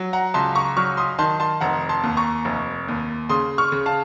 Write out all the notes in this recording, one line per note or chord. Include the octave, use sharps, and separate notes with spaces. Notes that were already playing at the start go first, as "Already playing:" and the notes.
Already playing: F#3
F#5 A#5
C#2 A5 C6
A#5 C#6
F#3 C#6 F6
C6 D#6
D#3 A5 C6
A5 C6
F1 F#5 A#5
A5 C6
D#2
A#5 C#6
F1
D#2
C#3 C6 D#6
C#6 F6
C#3
F5 A5